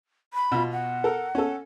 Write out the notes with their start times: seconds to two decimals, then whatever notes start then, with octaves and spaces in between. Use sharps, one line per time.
0.34 B5
0.52 B2 F4
0.72 F#5
1.04 A4 A#4
1.35 C#4 A4